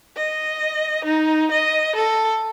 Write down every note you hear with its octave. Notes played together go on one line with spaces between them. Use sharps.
D#5
D#4
D#5
A4